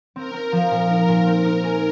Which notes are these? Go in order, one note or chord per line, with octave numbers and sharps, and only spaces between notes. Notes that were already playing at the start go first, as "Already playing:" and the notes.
C4 A#4
C4
F3
A#2
D#4
A#2
C4
D#4
G#4